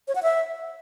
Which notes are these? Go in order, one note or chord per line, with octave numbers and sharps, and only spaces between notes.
C#5
F#5
E5